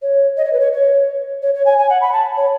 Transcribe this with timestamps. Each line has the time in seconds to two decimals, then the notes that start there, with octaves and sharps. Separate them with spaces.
0.02 C#5
0.37 D#5
0.45 C#5
0.53 B4
0.60 C#5
0.73 C#5
1.42 C#5
1.54 C#5
1.66 G#5
1.78 G#5
1.90 F#5
2.01 B5
2.13 A5
2.37 C#5